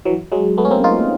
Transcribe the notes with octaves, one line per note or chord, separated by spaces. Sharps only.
E3 F#3
F#3 G#3
A3 B3
C#4
A#3 C4
D#4 F4